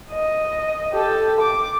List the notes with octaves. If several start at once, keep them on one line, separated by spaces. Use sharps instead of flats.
D#5
G4 A4
D6